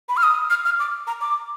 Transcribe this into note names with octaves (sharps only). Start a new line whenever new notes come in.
B5
F6
D#6
F6
F6
D6
A#5
D6